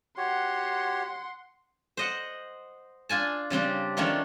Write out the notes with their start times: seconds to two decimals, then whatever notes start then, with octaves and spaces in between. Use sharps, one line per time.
0.17 F#4 G4 C#5 F#5 C6
1.97 C5 D#5 F#5
3.09 D4 F4 G#5 A5
3.50 C#3 G3 C4 D4
3.97 D#3 F3 A3 C#4 D4